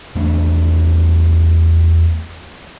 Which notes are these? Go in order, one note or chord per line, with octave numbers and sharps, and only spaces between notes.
E2 A3 D4